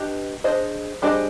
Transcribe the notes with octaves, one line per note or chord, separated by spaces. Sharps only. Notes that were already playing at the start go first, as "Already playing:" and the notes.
Already playing: D4 G4 B4 D#5
D4 G#4 C5 D#5
G3 D4 G#4 C5 D#5